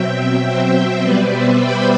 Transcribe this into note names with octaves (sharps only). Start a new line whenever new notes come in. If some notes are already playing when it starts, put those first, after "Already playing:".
Already playing: B2 F#3 C4 E5 G5
E5 G5
C5 E5
B2 G3 B3 B4 D5
C5 E5
G5 B5